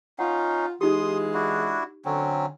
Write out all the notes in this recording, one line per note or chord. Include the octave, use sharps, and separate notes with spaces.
C#4 D#4 F4 F#5
E3 G#3 D#4 F4 G4 C6 D#6
D4 E4 F#4
D3 F#3 C4 C#4